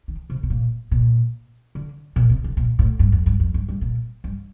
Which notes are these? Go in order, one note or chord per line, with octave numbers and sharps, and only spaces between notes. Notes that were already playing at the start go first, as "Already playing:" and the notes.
D#3
C3
C3
A#2
A#2
D3
A#2
C3
D3
A#2
A2
G2
F2
G2
F2
G2
G2
A#2
G2